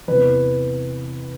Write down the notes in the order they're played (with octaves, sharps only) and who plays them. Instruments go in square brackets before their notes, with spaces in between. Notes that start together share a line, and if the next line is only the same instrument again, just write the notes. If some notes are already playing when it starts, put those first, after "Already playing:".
[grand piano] E2 C3 E3 B4